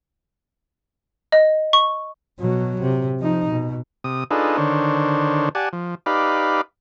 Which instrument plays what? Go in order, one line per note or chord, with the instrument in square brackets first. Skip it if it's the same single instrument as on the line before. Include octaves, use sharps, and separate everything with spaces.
[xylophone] D#5
C#6
[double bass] B2 F#3
C3
F3 D#4
B2
[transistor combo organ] C3 D#6
D4 D#4 F4 G#4 A4 B4
D3 D#3 D4 C5 C#5
G4 D5 F#5 G#5 A5
F3
D#4 G4 B4 D5 F5 B5